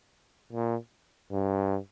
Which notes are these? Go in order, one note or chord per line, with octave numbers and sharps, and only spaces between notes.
A#2
G2